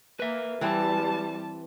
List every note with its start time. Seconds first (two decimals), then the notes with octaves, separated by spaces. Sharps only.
0.20 A#3 B4 E5
0.61 E3 G3 C4 E4 A5